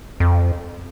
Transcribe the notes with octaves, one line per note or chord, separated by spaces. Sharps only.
F2